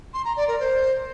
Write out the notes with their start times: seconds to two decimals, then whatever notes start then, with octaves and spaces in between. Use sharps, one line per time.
0.14 C6
0.25 A#5
0.37 D5
0.48 A#4
0.60 C5